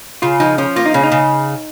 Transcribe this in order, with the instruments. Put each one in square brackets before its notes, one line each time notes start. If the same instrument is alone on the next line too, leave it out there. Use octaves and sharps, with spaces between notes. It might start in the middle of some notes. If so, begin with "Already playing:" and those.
[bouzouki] C#3 [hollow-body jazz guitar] F4
[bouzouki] F3 [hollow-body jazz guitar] D#4
[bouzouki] F3 [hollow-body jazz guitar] C#4
[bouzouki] A#3 [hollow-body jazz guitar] F4
[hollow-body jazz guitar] D#4
[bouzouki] C#3 [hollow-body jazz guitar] C#4
[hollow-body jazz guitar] D#4
[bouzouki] C#3